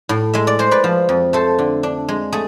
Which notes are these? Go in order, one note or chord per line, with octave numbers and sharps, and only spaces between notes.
A2
G#3 E5
D5
G#3 C5
B4 D5
F3
F2
A3 A4 C5
D3
D4
G#3
A3 G#4